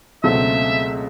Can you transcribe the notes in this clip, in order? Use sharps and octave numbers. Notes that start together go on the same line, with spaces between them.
C#2 B2 F#3 A3 C4 E5